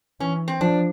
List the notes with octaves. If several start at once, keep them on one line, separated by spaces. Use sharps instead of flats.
E3 C#4
C4
F3 D4